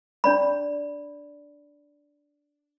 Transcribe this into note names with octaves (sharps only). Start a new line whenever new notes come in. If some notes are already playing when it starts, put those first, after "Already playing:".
D4 D5 B5